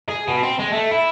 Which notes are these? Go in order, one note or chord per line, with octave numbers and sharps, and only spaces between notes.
G#4
B2
C4
G#3
A3
E4